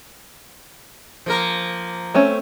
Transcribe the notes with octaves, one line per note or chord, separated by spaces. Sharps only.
F3 A#3 A#4
A3 C4 C#4